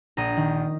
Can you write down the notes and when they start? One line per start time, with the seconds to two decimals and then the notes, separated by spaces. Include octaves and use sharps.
0.17 A#1 A#5 D#6
0.37 D#3